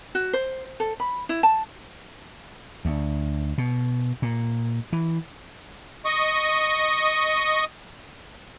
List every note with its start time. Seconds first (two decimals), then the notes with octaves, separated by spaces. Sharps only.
0.15 F#4
0.33 C5
0.80 A4
1.00 B5
1.29 E4
1.43 A5
2.85 D2
3.58 B2
4.22 A#2
4.93 E3
6.05 D#5 C#6 D#6